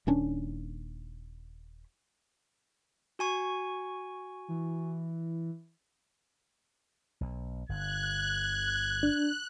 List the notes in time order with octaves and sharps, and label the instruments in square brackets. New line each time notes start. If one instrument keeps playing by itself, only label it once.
[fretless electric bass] D#1 D#2 C#4 D4
[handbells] F#4 G#5 C#6
[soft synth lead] E3
[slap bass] B1
[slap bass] G1 D3 [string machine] F#6 [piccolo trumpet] G#6
[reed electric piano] D4